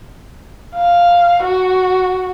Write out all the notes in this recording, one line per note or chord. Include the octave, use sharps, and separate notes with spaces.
F5
F#4